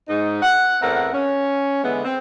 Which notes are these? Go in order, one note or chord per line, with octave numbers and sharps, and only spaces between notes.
G#2 D#4
F#5
E2 A3 C4 A#4 B4 F#5
C#4
D3 E3 G#3 B3
C4